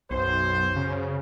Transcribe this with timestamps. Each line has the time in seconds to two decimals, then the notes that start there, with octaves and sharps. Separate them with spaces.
0.11 B1 F#2 C5
0.76 C#3